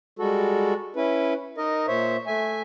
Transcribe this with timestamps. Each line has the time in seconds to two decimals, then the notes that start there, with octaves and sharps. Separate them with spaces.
0.19 G3 G#3 F#4 A4
0.96 C#4 E4 B4
1.58 D#4 A#4 D#5
1.87 A#2 C5 C#5 E5
2.27 A3 E5 G#5